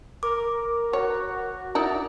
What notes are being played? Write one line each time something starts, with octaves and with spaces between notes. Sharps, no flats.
A#4 D6
F#4 C#5
D#4 E4 A#4 D5 A#5